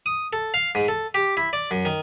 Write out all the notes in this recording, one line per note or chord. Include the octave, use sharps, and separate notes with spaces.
D#6
A4
F5
G#2
A4
G4
E4
D5
F#2
D#3